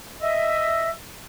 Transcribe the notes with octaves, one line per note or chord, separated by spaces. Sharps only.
D#5 E5